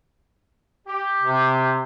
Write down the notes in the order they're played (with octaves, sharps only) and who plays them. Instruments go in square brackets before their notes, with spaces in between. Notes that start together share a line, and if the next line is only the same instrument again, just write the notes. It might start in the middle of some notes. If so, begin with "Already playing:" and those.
[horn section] G4
[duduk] C3